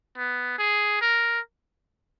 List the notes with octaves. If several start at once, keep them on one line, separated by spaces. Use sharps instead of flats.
B3
G#4
A#4